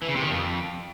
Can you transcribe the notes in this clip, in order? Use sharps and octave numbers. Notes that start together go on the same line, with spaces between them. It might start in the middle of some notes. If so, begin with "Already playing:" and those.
E3
C#3
C3
D#3
F2